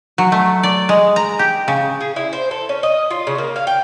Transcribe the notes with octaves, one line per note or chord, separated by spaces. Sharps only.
F#3
A3
D5
G#3
A#5
G4
C#3
G#4
E4
C5
A4
C#4
D#5
F4
C#3
A#3
F5
G5